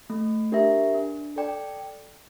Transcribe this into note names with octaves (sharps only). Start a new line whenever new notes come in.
A3
D4 G4 A#4 E5
D4
A4 D5 G5